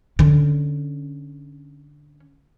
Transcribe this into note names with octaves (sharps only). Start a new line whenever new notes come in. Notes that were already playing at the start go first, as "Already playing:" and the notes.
D3 C#4